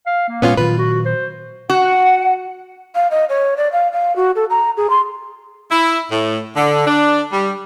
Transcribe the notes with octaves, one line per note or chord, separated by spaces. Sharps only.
F5
A#3
A#2 G3 G#3 B3 C#4 F4
A#2 D#3 F#3 F4 B4
F#4
C5
F#4 F#5
F5
D#5
C#5
D5
F5
F5
F#4
A4
A#5
G#4
C6
E4
A2
D3
D4
G3